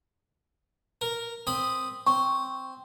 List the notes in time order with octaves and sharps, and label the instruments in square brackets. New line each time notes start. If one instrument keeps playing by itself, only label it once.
[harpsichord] A#4
C4 B5 D#6
[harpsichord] C4 [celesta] C#6